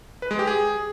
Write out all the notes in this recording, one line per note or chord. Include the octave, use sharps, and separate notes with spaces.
B4
G#3
G4
G#4